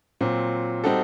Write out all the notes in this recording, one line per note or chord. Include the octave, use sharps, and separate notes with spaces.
A#2 F#3 C4
G3 C4 D#4 F#4 A4